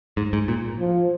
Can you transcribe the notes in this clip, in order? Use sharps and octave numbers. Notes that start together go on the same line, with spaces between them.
G#2
G#2
A#2
F3